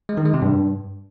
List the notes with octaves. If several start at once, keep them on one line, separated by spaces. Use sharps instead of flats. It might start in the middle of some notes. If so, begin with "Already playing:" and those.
G#3
D#3
G#3
C3
G2